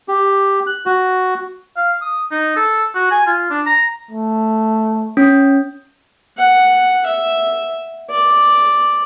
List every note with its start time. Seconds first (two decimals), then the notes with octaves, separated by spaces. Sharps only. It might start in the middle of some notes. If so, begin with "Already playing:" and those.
0.08 G4
0.67 F#6
0.86 F#4
1.77 F5
2.01 D#6
2.31 D#4
2.56 A4
2.95 F#4
3.11 G#5
3.27 F4
3.51 D4
3.66 A#5
4.11 A3
5.17 C#4
6.38 F#5
7.06 E5
8.10 D5